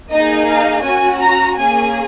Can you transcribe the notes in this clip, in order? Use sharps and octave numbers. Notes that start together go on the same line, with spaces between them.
A#3 D#4 G#4 D#5
F5
C#4 F#4 G#5
A#5
A#3 C#4 G#4 G#5